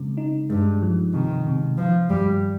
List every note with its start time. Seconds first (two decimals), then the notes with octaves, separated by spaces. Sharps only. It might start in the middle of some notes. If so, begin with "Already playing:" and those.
Already playing: C#3 G#3 C4
0.17 D#4
0.50 G2 G#3
0.82 F3
1.13 C3 D#3
1.47 C3
1.78 D#3 F3
2.10 G2 G3